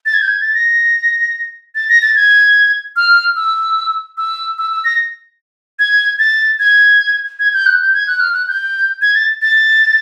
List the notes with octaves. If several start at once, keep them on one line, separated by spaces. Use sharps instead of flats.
A6
G#6
G6
G#6
A6
A#6
A6
A#6
A6
G#6
F6
E6
E6
E6
E6
A#6
G#6
A6
G#6
G#6
G6
F#6
G6
G#6
F#6
F6
F#6
G6
G#6
A6
A6